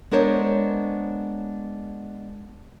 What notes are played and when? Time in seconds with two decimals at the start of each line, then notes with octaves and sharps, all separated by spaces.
0.11 G#3 B3 D4 A#4 C5 C#5